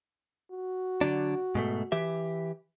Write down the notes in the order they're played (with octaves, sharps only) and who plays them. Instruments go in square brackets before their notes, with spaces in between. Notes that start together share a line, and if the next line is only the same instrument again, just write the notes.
[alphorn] F#4
[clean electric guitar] D3 F#3 D4
G#2 B2 A3
E3 G4 E5